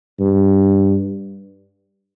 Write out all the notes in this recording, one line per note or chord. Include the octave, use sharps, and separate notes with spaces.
G2